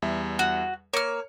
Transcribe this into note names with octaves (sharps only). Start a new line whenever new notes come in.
E2 G3 E5
F#4
A#3 C#5 F6 C#7